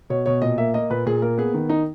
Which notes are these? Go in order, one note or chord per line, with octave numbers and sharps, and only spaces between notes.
B2 C#5
B2 C#5
A#2 D#5
A#3 E5
A#3 D#5
A#2 B4
A#2 G#4
A#3 A#4
B3 G#4
D#3
D#4